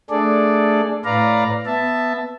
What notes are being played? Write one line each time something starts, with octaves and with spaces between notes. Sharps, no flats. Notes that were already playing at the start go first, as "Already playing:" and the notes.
A3 D4 G#4 A4 D5
A2 B4 D5 F5 A#5
B3 E5 A5